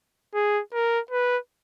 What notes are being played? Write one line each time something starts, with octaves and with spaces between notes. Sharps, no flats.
G#4
A#4
B4